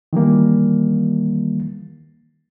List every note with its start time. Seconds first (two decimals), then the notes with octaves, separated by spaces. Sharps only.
0.13 D#3 E3 G3 A#3